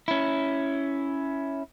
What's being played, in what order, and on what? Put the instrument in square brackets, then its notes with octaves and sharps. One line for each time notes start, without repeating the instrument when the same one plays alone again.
[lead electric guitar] C#4 E4